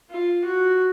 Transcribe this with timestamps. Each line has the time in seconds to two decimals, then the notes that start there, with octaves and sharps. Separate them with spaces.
0.10 F4
0.44 F#4